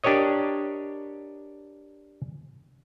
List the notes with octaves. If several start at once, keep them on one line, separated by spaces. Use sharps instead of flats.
D4 G4 A#4 C#5 D#5